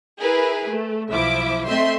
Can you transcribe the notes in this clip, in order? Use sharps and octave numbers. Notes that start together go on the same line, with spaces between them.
E4 G#4 A#4 B4
A3
B1 F3 E4 E5 D6
A3 C4 D#5 E5 C6 G6